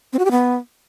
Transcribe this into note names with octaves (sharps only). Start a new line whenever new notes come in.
C4
F#4
G4
B3